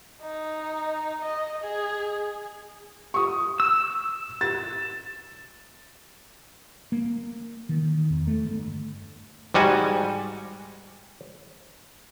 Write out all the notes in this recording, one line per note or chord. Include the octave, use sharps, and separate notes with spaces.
D#4
D#5
G#4
C#6 D#6
E6
A6
A#3
D#3
E2
A3
G1
G#2 G3 F#4 G#5